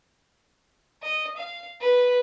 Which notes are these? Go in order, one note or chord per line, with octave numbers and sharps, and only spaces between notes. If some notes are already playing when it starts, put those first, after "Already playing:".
D#5
F5
B4